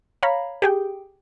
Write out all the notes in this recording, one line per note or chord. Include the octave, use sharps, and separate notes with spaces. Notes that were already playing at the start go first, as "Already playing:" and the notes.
C#5 F5 A#5 B5
G4 G#4 G5